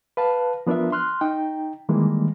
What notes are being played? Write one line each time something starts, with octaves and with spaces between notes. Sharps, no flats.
B4 F5 A5
F3 B3 D4 F4 A#4 E5
C6 F6 F#6
D#4 G5
D#3 E3 G3 G#3 A#3